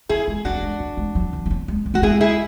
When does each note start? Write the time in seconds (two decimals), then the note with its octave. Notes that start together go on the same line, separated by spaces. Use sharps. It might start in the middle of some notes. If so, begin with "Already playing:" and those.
0.09 E3 E4 G#4
0.28 G#3
0.45 G#3 D4 F#4
0.55 F#3
0.62 G#3
0.80 A3
0.97 G#3
1.15 F#3
1.33 E3
1.46 G#3
1.50 F#3
1.68 G#3
1.86 G#3
1.94 A3 F#4
2.02 G#3 E4 G#4
2.21 E4 G#4